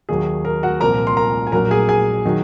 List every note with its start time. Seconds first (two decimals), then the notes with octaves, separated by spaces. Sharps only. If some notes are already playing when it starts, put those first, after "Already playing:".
0.09 D#2 D#3 F#3 G#4
0.45 A#4
0.63 F#4 F#5
0.81 C2 A#2 F3 A#4 A#5
1.07 C6
1.17 A#4 A#5
1.47 G#5
1.52 A#1 A#2 F#3 A#4 A#5
1.71 G#4 G#5
1.89 G#4 G#5
2.25 D#3 F#3